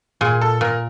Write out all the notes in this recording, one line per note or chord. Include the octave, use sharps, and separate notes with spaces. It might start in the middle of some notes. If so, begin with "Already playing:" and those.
A#2 G#4
A4
A#2 A#4